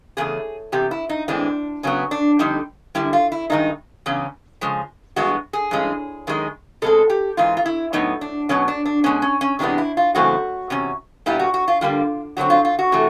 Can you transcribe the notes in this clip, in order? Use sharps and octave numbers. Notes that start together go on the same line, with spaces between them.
E2 C#3 A3 G#4
E2 C3 G4
E4
D#4
A2 E3 G#3 C4 D4
C#3 F#3 B3 C#4
D4
F2 D3 G3 D#4
F#2 D3 G3 E4
F4
E4
G2 D#3 G#3 D#4
E2 C#3 C#4
C#3 F3 G#3
G2 E3 G#3 B3 F#4
G#4
G2 E3 G#3 C#4
F#2 D#3 G#3
B2 G#3 C4 A4
G4
G#2 E3 F4
F4
E4
A2 F#3 B3 D#4
D4
B2 F#3 B3 C#4
D4
D4
B2 G#3 B3 C#4
C#4
C#4
C3 E3 G#3 B3 D4
E4
F4
F#2 C#3 E3 A3 C4 F#4
E2 C3 C#4
A#2 G3 B3 E4
F#4
F#4
F4
G2 D3 G3 A#3 F4
D3 F#3 A3 C4 F#4
F4
F4
F#4
C3 E3 A3